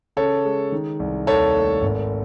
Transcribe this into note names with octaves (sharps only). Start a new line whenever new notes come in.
C#3 A4 C#5
G#3
D#3
C2
D#2 A4 C#5
A3
G#1